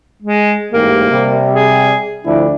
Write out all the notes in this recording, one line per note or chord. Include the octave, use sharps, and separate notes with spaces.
G#3
A1 G#2 A#3 G4
C3 G3
G#4
D2 F3 D4 E4